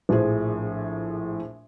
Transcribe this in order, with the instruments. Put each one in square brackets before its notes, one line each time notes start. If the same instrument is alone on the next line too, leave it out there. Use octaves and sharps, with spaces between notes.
[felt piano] A#1 A2 F3 G#4 C5